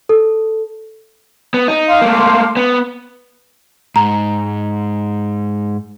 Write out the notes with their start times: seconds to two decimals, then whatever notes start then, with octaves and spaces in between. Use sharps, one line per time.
0.09 A4
1.54 B3
1.68 D#4
1.89 F5 C6 D6
2.01 A3 A#3
2.57 B3
3.96 G#2 A#5